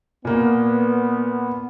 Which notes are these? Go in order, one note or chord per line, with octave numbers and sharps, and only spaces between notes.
A#2 A#3 B3